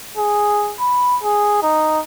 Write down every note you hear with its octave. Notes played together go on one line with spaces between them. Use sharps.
G#4
B5
G#4
D#4